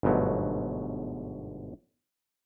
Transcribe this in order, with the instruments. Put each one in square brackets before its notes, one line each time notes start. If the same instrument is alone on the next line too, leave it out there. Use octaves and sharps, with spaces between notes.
[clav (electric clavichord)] G1 G#2 B2 F#3 A3